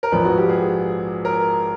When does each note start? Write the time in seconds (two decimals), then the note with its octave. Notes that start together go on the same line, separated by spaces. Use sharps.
0.03 A#4
0.12 A#1 G#2 F3 B4
0.25 F#4
0.37 G4
0.49 G#4
1.25 A#4